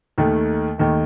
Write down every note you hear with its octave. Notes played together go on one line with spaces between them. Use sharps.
D#2 D#3 A3
D#2 D#3 A3